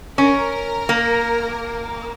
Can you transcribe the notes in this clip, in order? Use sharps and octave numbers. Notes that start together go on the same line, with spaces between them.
C#4 A#4
A#3